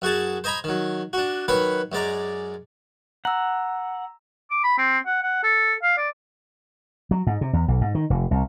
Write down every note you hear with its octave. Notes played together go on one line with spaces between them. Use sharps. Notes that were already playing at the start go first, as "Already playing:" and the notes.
F#2 F#4 G#4 A5
C5 D#5 G#5 A#5 B5
D#3 F#3
D4 F#4
D#3 F#3 B4 F#5 B5
F#2 G#3 D5 A#5
F#5 A#5 E6
D6
B5
C4
F#5
F#5
A4
F5
D5
F#3
G#2
C3
E2
B1
G#2
D#3
F1
C2